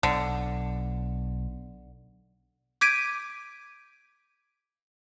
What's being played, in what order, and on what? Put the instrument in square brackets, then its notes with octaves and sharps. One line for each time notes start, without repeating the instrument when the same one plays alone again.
[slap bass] B1 [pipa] D3
[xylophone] D6 G6 G#6 B6 D7 D#7